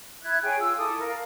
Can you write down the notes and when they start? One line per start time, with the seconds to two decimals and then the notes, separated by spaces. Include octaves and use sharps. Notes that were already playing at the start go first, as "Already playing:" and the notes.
0.23 E4 E5 F#6 G#6
0.43 G#4 C#5 G5 G#5
0.59 F4 E6
0.77 E4 A4 D6 D#6
1.00 A#4 F5